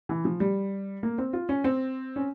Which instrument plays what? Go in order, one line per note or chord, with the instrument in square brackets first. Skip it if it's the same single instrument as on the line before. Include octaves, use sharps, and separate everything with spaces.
[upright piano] E3
F3
G3
A#3
C4
F4
C#4
C4
C#4